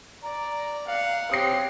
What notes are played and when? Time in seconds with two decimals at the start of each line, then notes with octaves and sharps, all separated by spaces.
0.23 D5 A#5
0.87 F5 F#5
1.31 C4 G4 C#5 D#6 C7